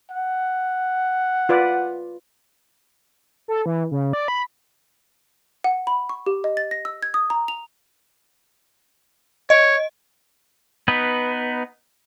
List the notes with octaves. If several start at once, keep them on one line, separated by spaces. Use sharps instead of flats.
F#5
F4 B4 D5
A4
E3
C#3
D5
B5
F#5
B5
C#6
G4
D#5
A6
A#6
E6
G#6
D#6
A#5
F7
C#5 D#5
B3 D#4 B4